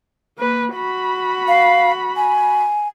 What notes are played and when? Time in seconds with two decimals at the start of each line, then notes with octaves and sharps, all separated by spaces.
0.38 A#3 B4
0.74 F#4 B5
1.48 F5
2.16 G#5